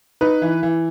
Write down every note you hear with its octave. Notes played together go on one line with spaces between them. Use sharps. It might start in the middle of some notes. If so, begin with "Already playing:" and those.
D#4 B4
E3
E3